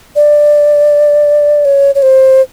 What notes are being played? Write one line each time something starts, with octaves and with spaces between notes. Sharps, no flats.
D5
C#5
C#5
C5